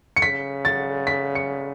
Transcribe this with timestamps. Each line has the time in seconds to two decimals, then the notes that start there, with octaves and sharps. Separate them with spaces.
0.16 C#7
0.22 C#3 B6
0.65 A6
1.07 B6
1.35 C#7